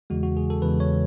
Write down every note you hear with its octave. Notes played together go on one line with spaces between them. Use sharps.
E2 C#3 E3 G#3 F#4
F#4
G#4
A4
E2 C#3 E3 G#3 B4
C#5